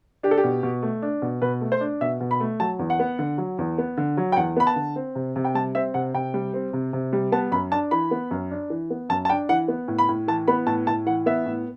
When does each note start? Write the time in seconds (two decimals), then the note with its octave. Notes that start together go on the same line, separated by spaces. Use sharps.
0.23 D4 G4
0.31 A4
0.37 G4
0.44 B2
0.63 B2
0.82 A3
1.02 D4
1.22 B2
1.42 B2 B4
1.61 A3
1.72 C5
1.81 D4
2.01 B2 E5
2.21 B2
2.31 B5
2.40 A3
2.60 F#3 A5
2.79 E2
2.90 F#5
3.00 B3
3.19 D3
3.38 F#3
3.58 E2
3.78 B3
3.97 D3
4.17 F#3
4.32 G5
4.36 E2 F#5
4.57 B3 B5
4.67 A5
4.76 D3
4.96 C4
5.15 C3
5.36 C3
5.45 G5
5.55 G3 A5
5.75 C4 E5
5.94 C3 F#5
6.14 C3 G5
6.34 G3
6.54 C4
6.73 C3
6.93 C3
7.13 G3
7.32 B3 A5
7.52 F#2 B5
7.71 D4 A5
7.91 E3 B5
8.11 B3
8.31 F#2
8.51 D4
8.70 E3
8.90 B3
9.09 F#2 A5
9.25 A5
9.30 D4 G5
9.49 E3 F#5
9.68 B3
9.88 A2
9.99 B5
10.09 A2
10.28 E3 A5
10.48 B3 B5
10.67 A2 A5
10.87 A2 A5
11.06 E3 F#5
11.26 B3 E5
11.46 A2